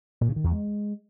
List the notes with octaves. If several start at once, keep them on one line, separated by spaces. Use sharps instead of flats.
A#2
C#3
D#3
E2
G#3